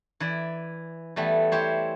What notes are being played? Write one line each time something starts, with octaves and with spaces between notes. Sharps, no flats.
E3 E4 D5
E3 G3 A3 B3
E4 G4 C5 C#5